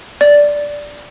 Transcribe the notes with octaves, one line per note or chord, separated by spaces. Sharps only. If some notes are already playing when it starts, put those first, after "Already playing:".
D5